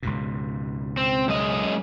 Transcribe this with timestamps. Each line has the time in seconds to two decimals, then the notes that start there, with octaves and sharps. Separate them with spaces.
0.03 C#2 G#2 B2
0.97 C4
1.28 F#2 G#3 D#5